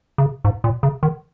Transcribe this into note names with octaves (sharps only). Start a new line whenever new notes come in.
C#3
G#2
A#2
C#3
D#3